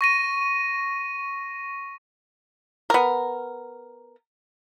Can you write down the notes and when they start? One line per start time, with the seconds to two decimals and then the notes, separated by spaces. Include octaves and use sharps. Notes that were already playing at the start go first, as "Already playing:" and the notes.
0.01 C#6 A#6 D#7
2.90 B3 A#4